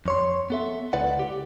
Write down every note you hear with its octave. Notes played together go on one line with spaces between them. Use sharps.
F2 C#5 C6
B3 A4 E5
C#2 E4 B4 D5 F#5
G4